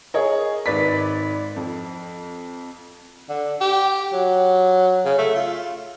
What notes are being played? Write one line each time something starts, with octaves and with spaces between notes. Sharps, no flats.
G#4 A#4 C#5 D#5
G#1 B4 D5 B6
F2
D3
G4
F#3
C#3
A3
F4